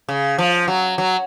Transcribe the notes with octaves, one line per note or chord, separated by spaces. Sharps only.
C#3
F3
F#3
F#3